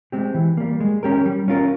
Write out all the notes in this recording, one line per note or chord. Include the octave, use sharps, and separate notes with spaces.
G#3 C4 G4
E3
G3 A#3
G#3
C#4 G4 A#4
G3
C#4 F4 A#4